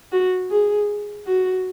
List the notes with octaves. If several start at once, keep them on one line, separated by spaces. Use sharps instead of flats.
F#4
G#4
F#4